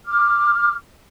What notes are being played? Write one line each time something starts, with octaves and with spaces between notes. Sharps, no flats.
D6 F6